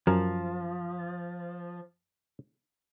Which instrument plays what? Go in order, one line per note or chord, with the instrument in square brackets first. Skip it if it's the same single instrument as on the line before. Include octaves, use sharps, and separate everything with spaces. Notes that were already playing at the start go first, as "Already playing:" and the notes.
[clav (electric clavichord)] F#2 A#4 G#5 [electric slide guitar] F3